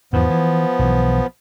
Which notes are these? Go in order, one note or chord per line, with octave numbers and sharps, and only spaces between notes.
E2 G#2 F3 B3
E3
B1 E3